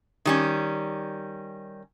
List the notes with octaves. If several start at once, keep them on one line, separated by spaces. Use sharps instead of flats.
D#3 G3 C#4